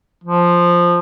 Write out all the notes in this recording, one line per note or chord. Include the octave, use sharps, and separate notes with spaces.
F3